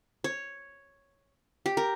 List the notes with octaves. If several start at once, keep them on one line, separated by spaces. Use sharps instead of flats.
C#5
G4
A#4